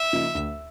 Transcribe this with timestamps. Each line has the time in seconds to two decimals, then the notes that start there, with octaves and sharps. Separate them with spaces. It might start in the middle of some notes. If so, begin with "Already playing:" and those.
Already playing: E5
0.13 C#3 F3 A#3 D#4
0.35 D2